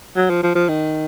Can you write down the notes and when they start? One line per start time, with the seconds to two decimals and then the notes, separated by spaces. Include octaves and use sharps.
0.16 F#3
0.30 F3
0.43 F3
0.55 F3
0.69 D#3